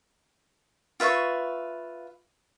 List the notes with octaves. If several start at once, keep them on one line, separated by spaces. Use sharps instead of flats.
F4 B4 E5 C#6